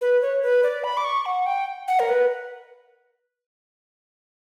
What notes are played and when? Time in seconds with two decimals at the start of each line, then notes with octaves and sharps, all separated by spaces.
0.01 B4
0.22 C#5
0.42 B4
0.63 D5
0.84 B5
0.97 D6
1.04 C#6
1.26 F#5
1.46 G5
1.88 F#5
1.99 A#4
2.09 B4